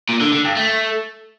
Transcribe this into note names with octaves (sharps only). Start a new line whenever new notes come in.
A#2
D3
D3
G2
A3